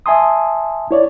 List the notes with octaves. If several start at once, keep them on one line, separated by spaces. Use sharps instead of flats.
E5 G#5 A5 C6 D#6
E4 C#5 D5